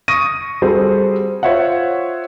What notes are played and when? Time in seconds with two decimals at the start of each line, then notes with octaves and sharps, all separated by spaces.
0.08 C#6 D#6 A#6 D#7
0.62 G3 C4 F#4 G#4 A4 C5
1.43 F4 C5 C#5 E5 F#5